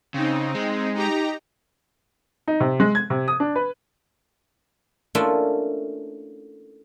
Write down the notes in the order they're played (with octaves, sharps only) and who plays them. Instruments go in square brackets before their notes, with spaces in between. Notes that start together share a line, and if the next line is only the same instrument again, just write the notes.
[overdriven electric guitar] C#3 [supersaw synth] C4 D#4
[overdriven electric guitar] G#3
[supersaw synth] D#4 G4 A#5
[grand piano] D#4
C3
G#3
G#6
C3
D#6
D4
B4
[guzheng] A3 A#3 C#4 D4 E4 F4